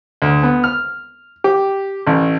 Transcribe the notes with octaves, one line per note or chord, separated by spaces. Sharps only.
D2
B3
F6
G4
A1